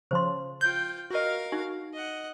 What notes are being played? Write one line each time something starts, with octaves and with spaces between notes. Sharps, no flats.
C#3 F3 C5 C6
F4 G5 G6
F#4 A#4 D#5 F5
D#4 F#4
D#5 F#5